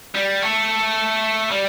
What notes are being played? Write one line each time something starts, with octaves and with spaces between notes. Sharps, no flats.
G3
A3
G3